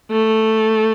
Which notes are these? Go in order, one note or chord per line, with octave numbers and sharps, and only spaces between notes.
A3